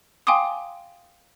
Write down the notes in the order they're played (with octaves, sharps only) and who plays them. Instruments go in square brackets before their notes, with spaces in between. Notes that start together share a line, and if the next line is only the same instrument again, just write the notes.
[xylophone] F5 G5 G#5 C6 D6 D#6